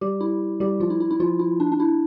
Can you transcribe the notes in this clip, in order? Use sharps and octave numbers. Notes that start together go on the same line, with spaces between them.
G3 G4
E4
G3 G4
F3 F4
E4
E4
E4
F3 F4
E4
D4
D4
E4